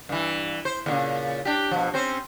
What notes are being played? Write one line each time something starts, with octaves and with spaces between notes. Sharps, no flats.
G2 E3
C5
E2 A#2 C#3
D4 G4
B2 F3
C4 C#4 C5